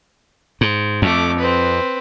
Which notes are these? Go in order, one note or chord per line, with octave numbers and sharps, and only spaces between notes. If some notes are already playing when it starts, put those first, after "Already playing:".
G#2
F2 A3 D6
C4 B4